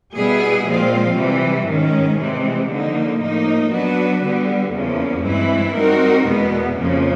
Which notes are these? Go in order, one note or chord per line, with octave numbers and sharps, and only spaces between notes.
B2 G3 B3 E4 G#4
A#2 F3 G#3 C4 F4
C3 E3 G3
G#2 D#3 G#3 C#4
C3 E3 G#3 C4
D3 F3 A#3 D#4
A2 F3 A#3 D#4
F#3 B3 D4 F#4 B4
D3 G3 B3
E2 C#3 F3 A#3 C#4
G2 E3 G#3 C4 E4
G3 C4 D#4 F#4 A#4
E2 B2 G#3 B3
F2 C#3 F3 A#3